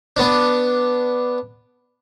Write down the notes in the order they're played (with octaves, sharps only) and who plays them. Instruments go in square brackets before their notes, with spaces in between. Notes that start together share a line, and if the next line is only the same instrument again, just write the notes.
[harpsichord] B3 D4